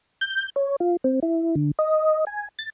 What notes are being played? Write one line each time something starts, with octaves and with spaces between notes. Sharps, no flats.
G6
C#5
F4
C4
E4
D3
D#5
G#5
A6